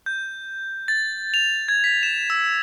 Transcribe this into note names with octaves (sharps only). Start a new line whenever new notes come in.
G6
A6
F7
G#6
B6
E7
E6